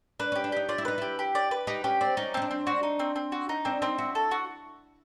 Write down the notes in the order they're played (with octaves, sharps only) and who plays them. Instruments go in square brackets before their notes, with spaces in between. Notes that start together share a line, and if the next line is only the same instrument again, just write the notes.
[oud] D4 [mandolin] B4
[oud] C#4 [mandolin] G4
[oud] D4
[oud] D#4 [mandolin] G4
[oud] F4 [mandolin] D5
[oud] E4
[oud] D#4 [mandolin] B4
[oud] E4 [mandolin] G4
[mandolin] G4
D5
B4
[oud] D#4 [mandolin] G4
[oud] C#4 [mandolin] G4
[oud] C4 [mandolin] D5
[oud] C#4 [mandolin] D#4
[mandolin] C4 [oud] C#4
[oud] D4
[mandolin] C4
[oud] D4 [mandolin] F#4
[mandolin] D#4
C4
C4
F#4
D#4
[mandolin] C4 [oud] D4
[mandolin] C4 [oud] D#4
[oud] E4 [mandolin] F#4
[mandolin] A4
F#4